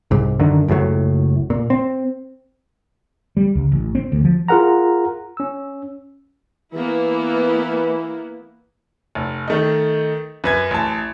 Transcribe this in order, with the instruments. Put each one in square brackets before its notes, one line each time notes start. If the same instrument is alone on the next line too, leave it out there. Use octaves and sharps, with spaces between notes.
[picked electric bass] C2 G#2
F#2 D3 D#3
F#1 C#2 A2 F#3
A#2
C4
[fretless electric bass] G3
C#2
A1
C4
D2
F3
[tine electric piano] F4 G#4 A#4 F#5 A#5
C#4 E6
[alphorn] E3 [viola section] A#3 B3 E4
[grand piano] F1
D#3 A3 D#4
F#2 B4 G#6
A1 A5